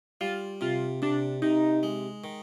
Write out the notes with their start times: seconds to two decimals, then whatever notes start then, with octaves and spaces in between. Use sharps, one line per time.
0.21 G3 F4
0.61 C3 F4
1.02 C3 D4
1.42 C3 D#4
1.83 G#3
2.24 D#3